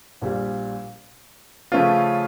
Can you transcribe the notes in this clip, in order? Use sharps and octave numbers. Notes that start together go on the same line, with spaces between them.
A#1 A#2 G3
C#3 F3 A3 C#4 F4